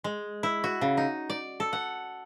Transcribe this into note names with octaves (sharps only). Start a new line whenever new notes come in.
G#3
E4
F#4
C#3
D#4
D5
A4
F#5